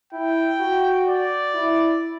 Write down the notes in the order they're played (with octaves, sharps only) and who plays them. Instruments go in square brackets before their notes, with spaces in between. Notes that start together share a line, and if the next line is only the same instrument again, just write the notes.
[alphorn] E4 [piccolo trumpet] G5
[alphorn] F#4
[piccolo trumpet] D5
[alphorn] E4